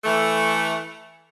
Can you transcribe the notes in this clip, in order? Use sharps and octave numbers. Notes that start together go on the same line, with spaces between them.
E3 A3